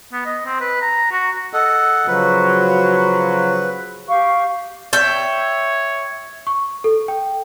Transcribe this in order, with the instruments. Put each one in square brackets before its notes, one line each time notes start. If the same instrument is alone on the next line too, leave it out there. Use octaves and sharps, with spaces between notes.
[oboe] B3
D#5
C4
B4
A#5
F#4
[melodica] A4 D#5 F#5
[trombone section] C#3 F3 F#3 [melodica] B4
[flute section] G4 F5 C#6
[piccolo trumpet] C#5 [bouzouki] E5 G5
[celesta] C#6
A4
G5